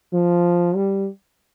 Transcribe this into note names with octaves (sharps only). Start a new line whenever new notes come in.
F3
G3